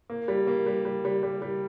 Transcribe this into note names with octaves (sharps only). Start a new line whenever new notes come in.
A#3
G3
A#3
G3
G3
G3
G3
G3